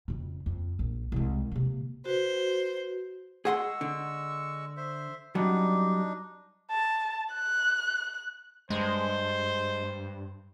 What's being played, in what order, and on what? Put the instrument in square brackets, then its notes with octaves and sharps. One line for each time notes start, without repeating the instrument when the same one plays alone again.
[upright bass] F2 C#3
F2
A#1
C2 G#3
C3 A#3
[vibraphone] F#4 B4 [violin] C5
[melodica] G#3 C#6 E6 [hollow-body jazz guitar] G#4 F#5 C6
[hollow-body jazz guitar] D3
[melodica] C5 E5
[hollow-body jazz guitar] F#2 F#3 G3 [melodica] D4 D#4
[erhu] A5
F#6
[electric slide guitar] G2 [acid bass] G#3 [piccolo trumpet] C5